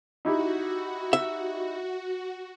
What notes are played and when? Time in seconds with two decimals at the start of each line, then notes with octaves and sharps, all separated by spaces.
0.25 D#4 E4 F#4 G4
1.13 E5